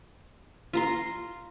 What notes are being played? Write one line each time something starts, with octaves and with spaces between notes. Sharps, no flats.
F4 A#5 C6